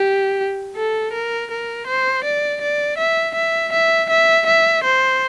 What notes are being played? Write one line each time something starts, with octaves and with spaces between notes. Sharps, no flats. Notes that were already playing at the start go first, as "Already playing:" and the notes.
Already playing: G4
A4
A#4
A#4
C5
D5
D5
E5
E5
E5
E5
E5
C5